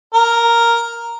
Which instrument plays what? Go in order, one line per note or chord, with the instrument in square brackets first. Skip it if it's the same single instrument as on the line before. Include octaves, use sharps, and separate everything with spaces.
[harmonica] A#4